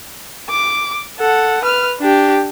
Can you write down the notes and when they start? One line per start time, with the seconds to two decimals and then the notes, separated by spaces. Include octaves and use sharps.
0.50 D6
1.19 A4 F#5
1.63 B4 F6
2.00 D4 G4